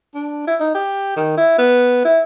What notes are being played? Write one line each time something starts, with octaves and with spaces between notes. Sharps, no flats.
D4
E4
D#4
G4
D#3
E4
B3
E4